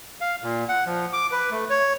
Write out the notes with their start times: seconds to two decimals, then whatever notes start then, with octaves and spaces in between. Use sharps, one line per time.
0.21 F5
0.43 A#2
0.69 F#5
0.86 F3
1.13 D6
1.32 B4
1.51 A3
1.70 C#5